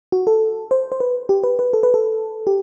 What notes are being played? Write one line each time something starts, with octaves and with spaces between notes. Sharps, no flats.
F#4
A4
C5
C5
B4
G4
B4
B4
A4
B4
A4
G4